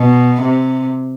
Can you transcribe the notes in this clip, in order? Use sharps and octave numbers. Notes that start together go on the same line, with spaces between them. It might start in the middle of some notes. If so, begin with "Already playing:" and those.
Already playing: B2
C3